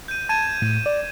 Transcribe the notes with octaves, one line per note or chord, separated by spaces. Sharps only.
G6 D#7
A5 G#6 D#7 E7
A2
D5